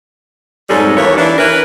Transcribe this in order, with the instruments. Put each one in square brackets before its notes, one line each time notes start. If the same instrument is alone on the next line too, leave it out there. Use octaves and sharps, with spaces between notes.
[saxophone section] F2 G#2 G3 G#3 A4 C#5
D#2 E3 A#3 B3 C#5
E3 D4
E3 A#4 B4